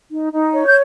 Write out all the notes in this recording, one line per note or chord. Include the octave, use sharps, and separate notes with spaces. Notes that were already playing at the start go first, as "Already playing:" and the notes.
D#4
D#4
C#5
G6